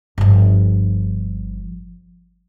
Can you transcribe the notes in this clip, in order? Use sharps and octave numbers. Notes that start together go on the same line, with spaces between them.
G1 F3